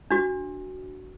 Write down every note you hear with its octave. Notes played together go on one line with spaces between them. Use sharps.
D4 F#4